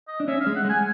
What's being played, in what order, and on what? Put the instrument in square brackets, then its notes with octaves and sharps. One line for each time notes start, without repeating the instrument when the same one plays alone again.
[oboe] D#5
[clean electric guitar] D4
[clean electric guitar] C#4 [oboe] E5
[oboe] F5
[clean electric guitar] G#3
[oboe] F#5
[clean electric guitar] G#3
[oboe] G#5